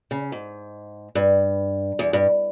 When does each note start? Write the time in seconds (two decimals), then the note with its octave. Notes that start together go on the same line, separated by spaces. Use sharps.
0.11 C#3
0.32 G#2
1.15 G2
1.99 E2
2.13 G2